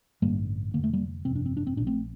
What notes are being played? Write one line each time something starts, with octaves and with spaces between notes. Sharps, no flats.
A1 G2 D3 G3 A#3
F1 E2 D3 A#3
A3
G3 A#3
G1 F2 C3 C4
D4
C4
D4
C4
A#1 A#2 D4
A3 C4